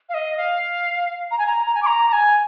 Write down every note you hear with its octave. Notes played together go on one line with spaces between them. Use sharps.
F5
D#5
F5
A#5
G#5
A#5
A#5
G#5
D6
A#5
A#5
G#5